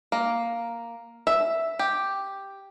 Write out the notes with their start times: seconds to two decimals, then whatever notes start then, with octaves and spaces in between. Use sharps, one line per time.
0.12 A#3
1.27 E5
1.79 G4